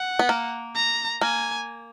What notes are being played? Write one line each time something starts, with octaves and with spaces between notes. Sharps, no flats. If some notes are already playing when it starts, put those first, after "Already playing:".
Already playing: F#5
B3
A#3
A#5
A#3 G#5